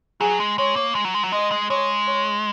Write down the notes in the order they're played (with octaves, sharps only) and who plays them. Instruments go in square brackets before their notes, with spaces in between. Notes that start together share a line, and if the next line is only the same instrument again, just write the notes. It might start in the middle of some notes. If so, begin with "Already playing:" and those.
[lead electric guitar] F#3 [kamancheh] G#4
[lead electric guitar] G#3
[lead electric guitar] G#3 [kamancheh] C#5
[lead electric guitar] A#3
G#3
F#3
G#3
F#3
[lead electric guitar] G#3 [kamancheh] D#5
[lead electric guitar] G#3
[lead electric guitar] G#3 [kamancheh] C#5
[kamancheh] C#5